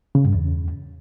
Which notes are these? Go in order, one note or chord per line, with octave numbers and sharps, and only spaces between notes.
C#3
G2
E2